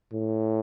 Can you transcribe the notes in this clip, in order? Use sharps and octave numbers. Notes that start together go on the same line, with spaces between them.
A2